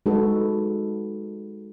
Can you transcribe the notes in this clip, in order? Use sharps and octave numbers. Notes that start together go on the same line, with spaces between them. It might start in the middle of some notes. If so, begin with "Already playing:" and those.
G#3 D#4 F#4 A4 B4